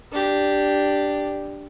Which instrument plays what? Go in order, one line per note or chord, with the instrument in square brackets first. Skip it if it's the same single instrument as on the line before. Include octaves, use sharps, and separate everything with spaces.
[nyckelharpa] D4 G4